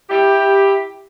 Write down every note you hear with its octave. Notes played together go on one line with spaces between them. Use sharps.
E4 G4